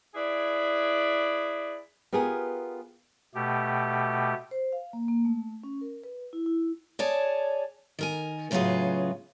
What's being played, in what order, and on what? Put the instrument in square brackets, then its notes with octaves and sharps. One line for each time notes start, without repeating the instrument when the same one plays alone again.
[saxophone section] E4 G#4 B4 D5
[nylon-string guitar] B3 F4 G4 G#4 A#4 G#5
[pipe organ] B2 A3 G4
[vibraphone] C5
F5
A#3
A#3
A3
C#4
A#4
B4
E4
E4
[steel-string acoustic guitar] G#4 C#5 D5 G#5 A5
D#3 A#4 G#5
A2 C#3 F#3 B3 F4 G#4